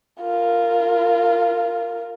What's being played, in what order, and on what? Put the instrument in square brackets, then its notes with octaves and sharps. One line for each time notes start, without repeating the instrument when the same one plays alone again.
[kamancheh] F4 A#4